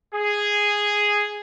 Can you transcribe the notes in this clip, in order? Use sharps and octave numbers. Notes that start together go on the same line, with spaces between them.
G#4